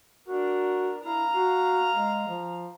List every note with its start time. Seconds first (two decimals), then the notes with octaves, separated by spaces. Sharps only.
0.28 D4 F#4 A#4
1.03 E4 F5 A#5
1.35 F#4
1.94 G#3
2.28 F3